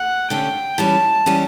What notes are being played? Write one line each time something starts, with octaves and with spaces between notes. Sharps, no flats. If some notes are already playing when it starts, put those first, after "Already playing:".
Already playing: F#5
D3 A3 C#4 G4 G5
E3 G3 C#4 G4 A5
E3 G3 C#4 G4